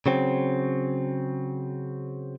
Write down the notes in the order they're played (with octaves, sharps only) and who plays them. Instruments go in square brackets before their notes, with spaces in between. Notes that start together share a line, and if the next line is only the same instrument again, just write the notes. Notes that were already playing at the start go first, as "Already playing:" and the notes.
[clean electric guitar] C#3 F#3 C4